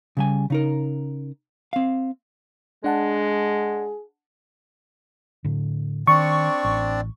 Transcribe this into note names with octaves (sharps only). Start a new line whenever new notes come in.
C#3 G3 G#5
C#3 D#4 A#4
C4 F5
G#3 D4 G#4 F#5 A5
A2 D3
D#3 C4 D4 D5 C#6
A1